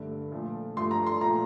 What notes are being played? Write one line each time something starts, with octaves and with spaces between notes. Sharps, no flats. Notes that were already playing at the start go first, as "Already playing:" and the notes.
Already playing: G2 D3 A3
A#2 F3 A3
G2 F3 A3 C6
A#5
C6
A#2 F3 A3 A#5